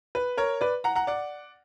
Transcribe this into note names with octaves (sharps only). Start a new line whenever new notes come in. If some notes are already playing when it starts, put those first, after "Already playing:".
B4
A#4 C#5
B4 D5
F#5 A#5
F#5 A#5
D5 F#5